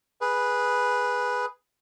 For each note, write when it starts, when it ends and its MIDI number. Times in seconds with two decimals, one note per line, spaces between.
0.21 1.46 68
0.21 1.46 71